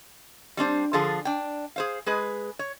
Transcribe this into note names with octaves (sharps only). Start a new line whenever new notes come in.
G3 C4 D4 C5
D3 F3 F4 G#4 A4
D4 G5
G#4 C5 F5
G#3 G#4 B4
C#5